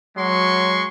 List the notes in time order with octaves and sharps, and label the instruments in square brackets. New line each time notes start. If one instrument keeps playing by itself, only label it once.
[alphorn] F#3 [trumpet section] G#3 C6 C#6